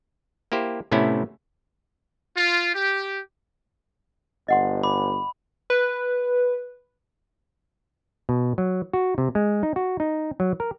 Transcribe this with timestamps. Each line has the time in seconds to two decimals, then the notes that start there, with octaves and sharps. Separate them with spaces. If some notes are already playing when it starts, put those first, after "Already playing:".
0.52 A#3 E4 G4 C5
0.92 A2 C3 A3 B3 C#4 E4
2.35 F4
2.74 G4
4.48 G1 D#5 F#5 C6
4.83 B5 D6
5.70 B4
8.29 B2
8.58 F#3
8.93 F#4
9.18 C3
9.35 G#3
9.63 D#4
9.76 F#4
10.00 D#4
10.40 F#3
10.60 A#4